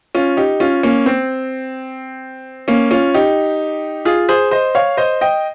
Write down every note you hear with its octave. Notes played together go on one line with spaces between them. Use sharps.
C#4 F4
D#4 G4
C#4 F4
A#3 C#4
C4
A#3 C#4
C#4 F4
D#4 G4
F4 G#4
G#4 C5
C5 D#5
C#5 F5
C5 D#5
D#5 G5